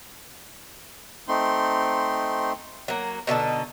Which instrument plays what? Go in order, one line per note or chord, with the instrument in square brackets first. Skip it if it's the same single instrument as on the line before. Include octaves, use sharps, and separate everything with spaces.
[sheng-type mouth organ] A3 C4 D#4 C6
[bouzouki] F#3 A#3
B2 D3 D#4 A4